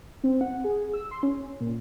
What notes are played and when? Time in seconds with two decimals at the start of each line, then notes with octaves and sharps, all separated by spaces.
0.24 C4
0.41 F#5
0.64 G#4
0.93 E6
1.11 C6
1.23 C#4
1.60 A#2